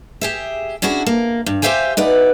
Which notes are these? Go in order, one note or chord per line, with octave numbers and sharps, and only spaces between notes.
G4 G#4 E5
C#4 D4 E4 F#4 G#4
A#3
G2
G4 C5 E5 F5 G5 G#5
D#4 B4 D5 F#5